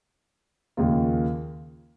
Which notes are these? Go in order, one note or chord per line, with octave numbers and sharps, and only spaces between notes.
D#2 C#3 F3 A#3 F4